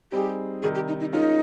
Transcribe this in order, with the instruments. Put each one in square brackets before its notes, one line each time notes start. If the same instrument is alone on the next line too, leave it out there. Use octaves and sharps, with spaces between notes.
[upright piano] G3 C4 D#4 G#4 [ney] G4
[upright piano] C3 D#3 G3 [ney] G#4
[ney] G4
D#4
D#4
[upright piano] G#3 C#4 F4 A#4 [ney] D#4